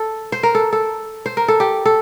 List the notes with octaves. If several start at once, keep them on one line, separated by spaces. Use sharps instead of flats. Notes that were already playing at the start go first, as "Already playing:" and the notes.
Already playing: A4
C5
A#4
A4
A4
C5
A#4
A4
G4
A4